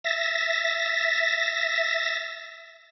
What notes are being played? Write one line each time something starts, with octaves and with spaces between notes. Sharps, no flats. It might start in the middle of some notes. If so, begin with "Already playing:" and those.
E5 A6 A#6